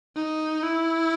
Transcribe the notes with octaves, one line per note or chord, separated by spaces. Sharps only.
D#4
E4